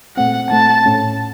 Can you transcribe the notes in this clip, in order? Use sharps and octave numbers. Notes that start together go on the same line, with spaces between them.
A#2 A3 C4 F#5
A#2 A3 C4 A5
A2 A3 C#4